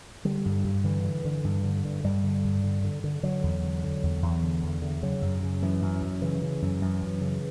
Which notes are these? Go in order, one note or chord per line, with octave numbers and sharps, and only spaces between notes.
D3 G3
G2
G2
D3 E3
D3
D3
G2
D3
G2
G2 G3
D3
G2
D3
D3
D3
D3 F#3
E2
D3
D3
E2
E2
D3
E2
D3
C#3 F#3
F#2
C#3
F#2 E3
F#2
F#2
C#3 E3
C#3
F#2
F#2
F#2
C#3